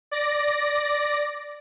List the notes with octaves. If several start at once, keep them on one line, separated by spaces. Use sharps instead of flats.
D5 A#6